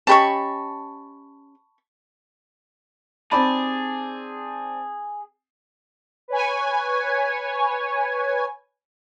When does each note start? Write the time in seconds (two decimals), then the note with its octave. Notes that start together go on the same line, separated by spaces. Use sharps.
0.07 C#4 G4 D#5 A5 B5 C#6
3.31 C4 D#4 G4 G#4 D5 A5 B5
6.28 B4 C#5 G#5